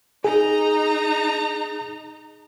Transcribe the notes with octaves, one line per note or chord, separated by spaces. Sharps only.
D#4 G#4 A#5